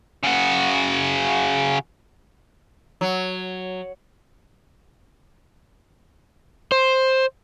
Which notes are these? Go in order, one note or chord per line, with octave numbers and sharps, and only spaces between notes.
C#3 F#4
F#3
C5